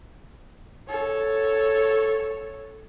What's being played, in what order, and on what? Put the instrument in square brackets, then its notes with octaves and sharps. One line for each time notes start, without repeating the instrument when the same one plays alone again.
[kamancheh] A4 C#5